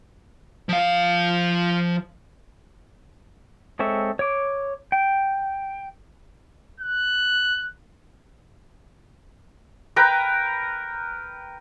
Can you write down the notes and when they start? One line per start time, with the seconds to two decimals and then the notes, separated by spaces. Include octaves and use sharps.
0.69 F3 F5
3.79 G#3 C4 A4 C#5 E5
4.19 C#5 D6
4.92 G5
6.80 F#6
9.96 A#4 B4 G5 A#5